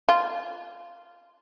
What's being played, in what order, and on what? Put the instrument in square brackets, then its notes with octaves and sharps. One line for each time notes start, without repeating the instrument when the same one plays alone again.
[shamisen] F4